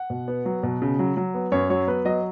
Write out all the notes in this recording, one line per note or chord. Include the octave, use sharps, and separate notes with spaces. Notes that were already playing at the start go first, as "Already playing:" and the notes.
Already playing: F#5
B2
B3
F#3
B2
C#3
F#3
F#3
B3
F#2 C#5
F#3 C#5
B3 B4
F#3 D#5